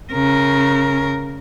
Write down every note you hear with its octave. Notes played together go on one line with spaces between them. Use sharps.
C#3 A#4